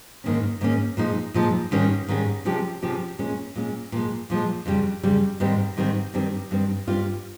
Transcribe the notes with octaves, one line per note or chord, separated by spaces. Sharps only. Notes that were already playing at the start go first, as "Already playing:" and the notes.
G#2 D#3 A#3 C#4
G#2 D#3 A#3 C#4
A#2 F3 G#3 D#4
A#2 F3 G#3 D#4
G#2 D#3 G3 C#4
G#2 D#3 G3 C#4
C3 F3 G#3 C#4 G4
C3 F3 G#3 C#4 G4
A#2 G#3 C#4
A#2 G#3 C#4
A#2 F3 G#3
A#2 F3 G#3
F2 C#3 G3
F2 C#3 G3
G#2 D#3 G3 C4
G#2 D#3 G3 C4
G2 D#3 G3 C4
G2 D#3 G3 C4
G2 G3 C4 F4